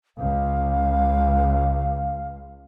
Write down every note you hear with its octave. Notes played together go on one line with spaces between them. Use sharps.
C#2 F5